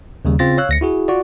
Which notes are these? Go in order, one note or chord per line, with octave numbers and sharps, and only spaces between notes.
D#2 C#3 G3
C#3 C4 F4 A6 A#6
C#5 F5 E6 F#6
D2 A#6 C#7
E4 F#4 G#4
F4 F#4 D5